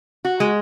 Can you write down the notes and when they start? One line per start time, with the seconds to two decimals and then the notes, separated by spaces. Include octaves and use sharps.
0.25 F#4
0.40 G#3